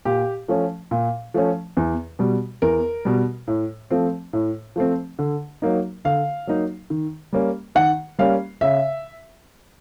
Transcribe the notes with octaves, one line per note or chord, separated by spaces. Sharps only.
A#2 G4
F3 A3 C#4
A#2
F3 A3 C#4
E2
B2 G3
E2 A#4
B2 G3
A2
F3 A3 C4
A2
F3 A3 C4
D3
F#3 A#3 D#4
D3 F5
F#3 A#3 D#4
D#3
G3 A#3 C#4
D#3 F#5
G3 A#3 C#4 F5
C#3 E5